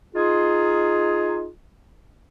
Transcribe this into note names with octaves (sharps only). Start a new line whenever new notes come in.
D#4 F4 G#4